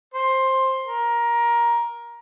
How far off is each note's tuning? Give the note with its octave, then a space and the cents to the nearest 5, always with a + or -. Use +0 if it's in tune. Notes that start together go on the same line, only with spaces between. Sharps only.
C5 +15
A#4 +15